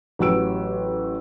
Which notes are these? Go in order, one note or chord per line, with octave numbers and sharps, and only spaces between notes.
A1 F#3 G4 E6 D7